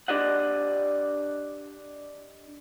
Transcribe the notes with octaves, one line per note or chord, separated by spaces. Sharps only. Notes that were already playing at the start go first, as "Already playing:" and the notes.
D4 G4 D5 D#5 F#5